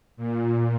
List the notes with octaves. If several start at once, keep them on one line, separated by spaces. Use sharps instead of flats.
A#2